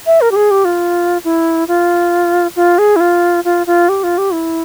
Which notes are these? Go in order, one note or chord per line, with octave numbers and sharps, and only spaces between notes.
E5
A#4
G4
G#4
G4
F4
E4
F4
F4
G#4
E4
F4
F4
F4
G4
F4
G4
E4